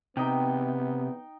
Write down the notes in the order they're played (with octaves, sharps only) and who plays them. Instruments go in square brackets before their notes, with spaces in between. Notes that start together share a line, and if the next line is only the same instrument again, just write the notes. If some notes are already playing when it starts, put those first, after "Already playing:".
[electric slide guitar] C3 [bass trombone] B3 [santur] D#4 G5